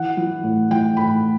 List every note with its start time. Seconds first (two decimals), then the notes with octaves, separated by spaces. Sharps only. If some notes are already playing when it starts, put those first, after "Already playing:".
Already playing: E3 F#5
0.17 E3
0.43 A2
0.70 E3 G5
0.97 A2 B5